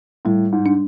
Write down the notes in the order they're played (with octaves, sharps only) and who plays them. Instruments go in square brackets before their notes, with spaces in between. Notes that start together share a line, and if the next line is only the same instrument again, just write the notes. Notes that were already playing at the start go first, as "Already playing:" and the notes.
[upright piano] A2 [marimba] G3
[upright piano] G#2
[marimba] D4